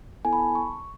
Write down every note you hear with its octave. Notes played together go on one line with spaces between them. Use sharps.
B3 E4 A4 G#5
B5
A5
C#6